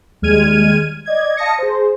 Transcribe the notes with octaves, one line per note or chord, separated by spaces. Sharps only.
D#2 G3 G#3 F6 G#6 D#7
D5 D#5 G#6
F5 A5 D#6 A#6 C#7
G#4 C5